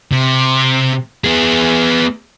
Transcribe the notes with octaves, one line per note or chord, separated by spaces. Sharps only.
C3
B3 G#4